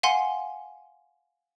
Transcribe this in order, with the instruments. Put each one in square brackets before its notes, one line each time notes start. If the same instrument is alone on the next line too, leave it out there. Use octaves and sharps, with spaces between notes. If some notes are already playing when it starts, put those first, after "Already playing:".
[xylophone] F5 F#5 G#5 C6